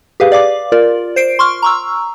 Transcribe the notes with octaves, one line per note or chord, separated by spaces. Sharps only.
G4 G#4 B4 F5
D5 F5 D6
F4 A#4 D5
C5 C7 D7
C6 C#6 F6
A#5 C#6 E6